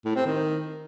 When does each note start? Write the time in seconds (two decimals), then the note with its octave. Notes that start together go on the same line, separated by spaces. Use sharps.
0.05 A2
0.15 C4
0.26 D#3